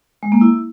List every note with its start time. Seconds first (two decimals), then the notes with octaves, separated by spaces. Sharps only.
0.23 G#3
0.32 A#3
0.41 E4